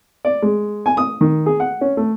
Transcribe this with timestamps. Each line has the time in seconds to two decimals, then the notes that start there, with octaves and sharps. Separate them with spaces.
0.25 D5
0.42 G#3
0.86 G#5
0.97 D#6
1.21 D#3
1.46 G#4
1.60 F#5
1.81 C#4
1.97 A3